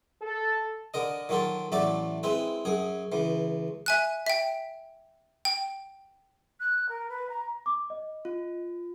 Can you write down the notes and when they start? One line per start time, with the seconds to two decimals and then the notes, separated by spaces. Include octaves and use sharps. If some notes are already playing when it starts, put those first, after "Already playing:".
0.22 A4
0.94 D3 A#4 D#5
1.29 D#3 F#3 A#3 F4 A4
1.72 A1 F#3 A3 D5 E5 D6
2.23 G#3 C4 E4 B4
2.65 F#2 G#4
3.12 C#2 E3
3.86 E5 G#5 F#6
4.27 E5 G5
5.45 G5
6.60 F#6
6.89 A#4
7.09 B4
7.29 A#5
7.66 D6
7.90 D#5
8.25 F4